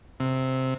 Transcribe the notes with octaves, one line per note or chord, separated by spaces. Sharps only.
C3